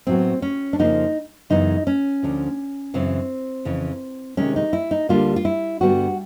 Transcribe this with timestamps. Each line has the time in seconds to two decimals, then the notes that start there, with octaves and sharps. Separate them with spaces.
0.07 A2 F#3 B3 C4
0.42 C#4
0.73 D4
0.79 F2 C#3 F3 A#3 D#4
1.50 F#2 C#3 E3 G#3 B3 D#4
1.87 C#4
2.23 D2 D3 F3
2.94 F#2 C#3 E3 C4
3.65 F2 C#3 E3
4.37 C3 D#3 G#3 C#4
4.56 D#4
4.73 E4
4.91 D#4
5.09 D2 D3 G3 A#3 F4
5.36 F4
5.45 E4
5.81 G2 D3 G3 B3 F#4